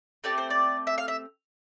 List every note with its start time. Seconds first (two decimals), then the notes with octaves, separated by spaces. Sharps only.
0.24 A3 C4 G4 D5
0.38 C5
0.50 D5
0.87 E5
0.98 F5
1.08 E5